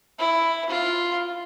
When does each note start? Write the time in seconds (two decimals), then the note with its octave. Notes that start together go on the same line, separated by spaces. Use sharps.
0.18 E4
0.69 F4